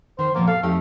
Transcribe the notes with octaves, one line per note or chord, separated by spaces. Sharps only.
D#3 C5
A#2 F3 A#3 B3
A4 F5
F2 A3 D#4 G4